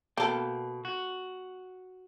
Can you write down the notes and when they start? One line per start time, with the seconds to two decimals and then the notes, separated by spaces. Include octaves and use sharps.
0.17 B2 A#3 A4 G5
0.85 F#4